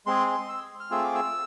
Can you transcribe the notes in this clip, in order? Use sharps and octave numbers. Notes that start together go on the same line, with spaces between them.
G#3 C4 G#4 C6
C6
E6
F6
A3 C4 F4 G#4 E6
D6
E6